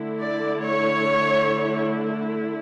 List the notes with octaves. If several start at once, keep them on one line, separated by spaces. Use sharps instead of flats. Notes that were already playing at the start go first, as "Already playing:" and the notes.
Already playing: D3 A3 E4
D5
C#5